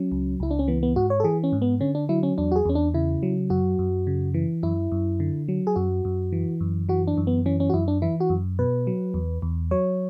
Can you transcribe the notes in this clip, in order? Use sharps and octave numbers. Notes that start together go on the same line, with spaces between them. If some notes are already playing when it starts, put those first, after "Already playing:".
Already playing: F#3 C#4
C#2
C#2 E4
D4
C#4
E3 B3
B3
G#2 F#4
C#5
A4
E3 G#4
C#4
G#2
B3
D3 C#4
D4
F#3 E4
C#4
E2 D4
F#4
G#4
E2 C#4
D4
C#3 E4
F#3
F#2 F#4
F#2
C#3
E3
F#2 E4
F#2
D3
F#3
G#4
F#2 F#4
F#2
E3
F#2
E3 F#4
D4
F#2
B3
E3 C#4
C#4
F#4
F#2 E4
D4
E3 E4
F#4
F#2
B2 B4
F#3
E2
E2
F#3 C#5